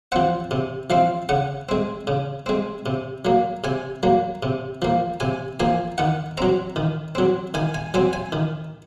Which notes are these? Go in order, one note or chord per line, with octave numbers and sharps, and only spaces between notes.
F3 C4 F#5
C3
F3 C4 F5
C#3 F#5
G#3 C4
C#3
G#3 C4
C3
F#3 A#3
C3 G#5
F#3 A#3
C3
F3 A#3
C3 G#5
F3 A#3 G#5
D#3 F#5
F#3 C4 A#5
D#3
F#3 C4
D#3 G#5
G#5
F#3 C4 G#5
G#5
D#3